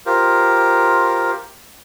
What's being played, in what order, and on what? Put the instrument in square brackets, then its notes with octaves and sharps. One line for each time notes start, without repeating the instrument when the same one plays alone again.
[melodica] F4 G4 A#4 C5